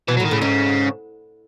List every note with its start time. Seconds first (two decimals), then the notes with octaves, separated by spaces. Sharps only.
0.08 B2 E3
0.17 F#3
0.20 A2
0.25 D#3
0.31 A2 C#3
0.41 G#2 C#3